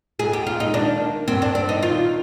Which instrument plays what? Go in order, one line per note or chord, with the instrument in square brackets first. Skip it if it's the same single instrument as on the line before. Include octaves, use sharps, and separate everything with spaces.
[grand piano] G#2 [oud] G#4
[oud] G4
[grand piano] G#2 [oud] F4
[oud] D#4
[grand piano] D#3 [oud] D4
[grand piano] A#3
[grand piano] G2 [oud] C4
[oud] D4
[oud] C4 [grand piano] D4
[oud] D#4
[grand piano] D#3 [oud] F4